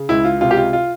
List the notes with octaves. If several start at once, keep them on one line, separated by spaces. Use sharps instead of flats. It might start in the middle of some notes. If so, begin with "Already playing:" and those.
Already playing: C#3
C#2 E4
F4
C3 F4
G4
F4
F4